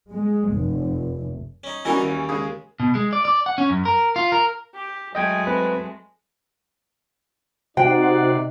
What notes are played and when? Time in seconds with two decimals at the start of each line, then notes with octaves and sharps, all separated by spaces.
0.11 G#3
0.52 F1
1.64 C#4 D#4
1.85 E3 G3 C#4 D#4 F#4 A#4
2.02 D#2
2.29 C#3 G#3
2.80 B2
2.95 G#3
3.13 D5
3.25 D5
3.46 F#5
3.58 C#4
3.70 F#2
3.85 A#4
4.16 F4
4.32 A#4
4.75 G4
5.15 F#3 G#3 A3 D#5 G5 G#6
5.47 C4 B4
7.77 C3 D#4 F#4 C5 D5 F#5 G5